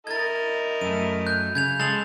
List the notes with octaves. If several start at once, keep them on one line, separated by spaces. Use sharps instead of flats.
E4 A#4 D#5 G#6 A6
F#2 A3 D#7
F#6 G6
C#3 G6 G#6 F7
G#3 G#4 A4 A6 F7 F#7